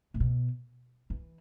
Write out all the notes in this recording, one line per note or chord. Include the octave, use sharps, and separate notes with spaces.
A2
B2
E3